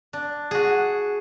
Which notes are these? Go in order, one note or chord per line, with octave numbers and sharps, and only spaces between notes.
D4
F#4 G#4